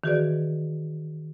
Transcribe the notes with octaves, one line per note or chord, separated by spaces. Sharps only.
D#3 E3 F#4 G#4 B4 D5